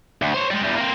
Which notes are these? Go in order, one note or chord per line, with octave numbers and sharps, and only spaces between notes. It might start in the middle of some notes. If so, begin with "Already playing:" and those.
D2
C5 C#5
G3 G#3
E2 G3
A#3 C4